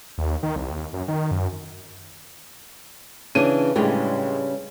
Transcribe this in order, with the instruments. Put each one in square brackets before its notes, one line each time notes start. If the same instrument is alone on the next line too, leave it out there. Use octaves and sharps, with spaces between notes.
[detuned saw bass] D#2
D#3
C2
D#2
F#2
D#3
F#2
[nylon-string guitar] C#3 E3 D4 [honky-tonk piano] D#7
[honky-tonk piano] A2 G#3 [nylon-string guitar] C#3 G3 D4